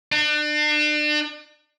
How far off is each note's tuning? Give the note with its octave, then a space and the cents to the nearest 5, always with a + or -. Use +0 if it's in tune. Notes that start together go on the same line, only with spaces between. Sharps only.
D4 +35